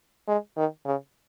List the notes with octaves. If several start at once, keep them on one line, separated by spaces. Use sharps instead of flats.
G#3
D#3
C#3